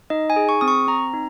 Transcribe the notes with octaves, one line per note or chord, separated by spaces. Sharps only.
D#4 D#5
G#5
G#4
C#6
C4 D#6
C#6
C4 A#5
D#4